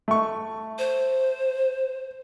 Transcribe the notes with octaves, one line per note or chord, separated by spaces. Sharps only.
A3 C#6
C5